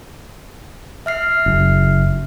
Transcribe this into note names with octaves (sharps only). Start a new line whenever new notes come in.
E5 F6 C7
F#1